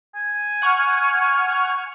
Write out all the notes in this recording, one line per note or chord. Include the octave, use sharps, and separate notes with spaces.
G#5
F#5 C#6 F6